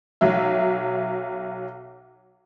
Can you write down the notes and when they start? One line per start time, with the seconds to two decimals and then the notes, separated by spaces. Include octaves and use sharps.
0.21 B1 F#3 E5